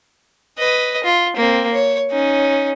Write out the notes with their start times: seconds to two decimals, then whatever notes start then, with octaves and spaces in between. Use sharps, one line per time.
0.59 B4 D#5
1.04 F4
1.37 A#3 C4
1.74 C#5
2.11 C#4 D#4